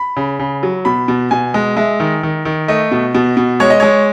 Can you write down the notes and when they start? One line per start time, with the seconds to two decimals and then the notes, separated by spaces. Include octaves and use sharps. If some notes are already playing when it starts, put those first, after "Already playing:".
Already playing: B5
0.16 C#3
0.39 C#3
0.63 F#3
0.85 B2 B5
1.08 B2
1.31 B2 G#5
1.54 G#3
1.77 G#3 E5
2.00 D#3
2.23 D#3
2.45 D#3
2.68 A3 D#5
2.92 B2
3.15 B2
3.37 B2
3.60 G#3 C#5
3.70 D#5
3.80 G#3 C#5